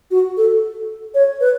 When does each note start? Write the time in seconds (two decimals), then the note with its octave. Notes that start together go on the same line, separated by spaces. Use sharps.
0.11 F#4
0.37 A4
1.15 C#5
1.41 B4